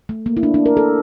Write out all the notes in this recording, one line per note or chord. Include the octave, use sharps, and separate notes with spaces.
A3
A#3
E4
D4
D4
A#4
A4